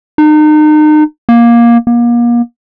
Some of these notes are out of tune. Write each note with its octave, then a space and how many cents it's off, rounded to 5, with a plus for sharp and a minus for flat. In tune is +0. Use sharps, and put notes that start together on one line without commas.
D#4 -35
A#3 +15
A#3 +35